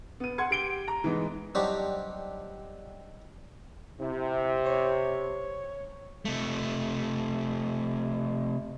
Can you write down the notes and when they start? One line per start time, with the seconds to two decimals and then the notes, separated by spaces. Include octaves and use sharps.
0.20 B3 D#7
0.38 F#5 C6 G#6 C#7
0.51 G4 D7 G7
0.88 A#5
1.04 E3 G#3 B3 D#4
1.55 F#3 G3 C4 D4 D#4 G4
4.00 C3 E4
4.66 C#5
6.25 C3 A3